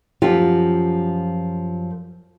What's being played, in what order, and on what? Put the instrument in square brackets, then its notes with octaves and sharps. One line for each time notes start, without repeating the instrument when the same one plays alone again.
[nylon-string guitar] F#2 F3 F4 G4